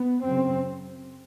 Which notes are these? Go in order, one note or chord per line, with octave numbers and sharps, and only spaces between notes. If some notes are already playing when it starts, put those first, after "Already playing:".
Already playing: B3
F#2 C#3 C4